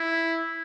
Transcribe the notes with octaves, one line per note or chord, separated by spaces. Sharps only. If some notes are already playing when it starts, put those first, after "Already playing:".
Already playing: E4